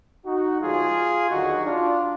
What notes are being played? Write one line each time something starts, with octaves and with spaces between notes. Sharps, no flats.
D#4 F#4
D2 D3 F3 G#3 F4 G#4
D#2 D3 F#3 D#4 F#4
D4 F4